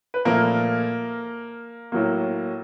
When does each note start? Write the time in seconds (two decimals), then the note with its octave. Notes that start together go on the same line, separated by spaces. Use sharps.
0.14 B4
0.25 A#2 F3 A3 A#3 A#4
1.92 A2 F#3 A#3